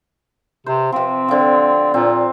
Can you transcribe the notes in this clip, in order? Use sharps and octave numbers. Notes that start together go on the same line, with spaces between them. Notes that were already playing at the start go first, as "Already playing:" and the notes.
C3 C5
C3 F3 C4
D3 F3
A#2 C4